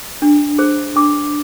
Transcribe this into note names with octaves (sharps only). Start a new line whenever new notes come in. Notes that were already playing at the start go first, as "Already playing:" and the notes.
D4
G#4 C5
D4 D6